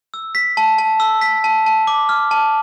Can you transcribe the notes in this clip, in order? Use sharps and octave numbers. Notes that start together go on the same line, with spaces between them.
E6
B6
A5
A5
E6
B6
A5
A5
D6
F6
A5